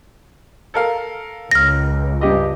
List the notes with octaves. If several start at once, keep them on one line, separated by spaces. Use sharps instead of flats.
A4 A#4 F5
C#2 F6 A#6
G2 G4 D#5